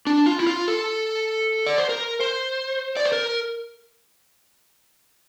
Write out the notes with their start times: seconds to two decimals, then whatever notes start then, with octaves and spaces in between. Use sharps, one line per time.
0.07 D4
0.26 F4
0.40 E4
0.47 F4
0.68 A4
1.66 D5
1.78 C5
1.89 A#4
2.20 C5
2.97 D5
3.05 C5
3.12 A#4